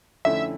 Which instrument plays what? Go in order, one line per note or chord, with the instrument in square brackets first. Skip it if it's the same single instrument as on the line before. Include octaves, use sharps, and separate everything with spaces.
[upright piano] F2 D3 A3 C#4 E4 [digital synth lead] E5